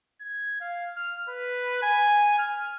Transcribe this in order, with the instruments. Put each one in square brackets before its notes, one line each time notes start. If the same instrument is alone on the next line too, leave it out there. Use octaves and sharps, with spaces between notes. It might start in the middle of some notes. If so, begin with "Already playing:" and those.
[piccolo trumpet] G#6
F5
F6
B4
G#5
F6